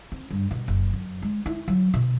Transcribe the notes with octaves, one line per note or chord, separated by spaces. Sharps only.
C4
G2
B2
F#1
F#2
G#3
E4
F#3
B2